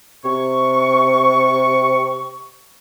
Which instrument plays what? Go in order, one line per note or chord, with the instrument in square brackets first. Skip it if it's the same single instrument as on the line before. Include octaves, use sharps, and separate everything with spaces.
[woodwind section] C3 C#6